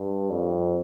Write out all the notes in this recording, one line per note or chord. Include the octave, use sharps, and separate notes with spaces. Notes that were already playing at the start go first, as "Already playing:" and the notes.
Already playing: G2
F2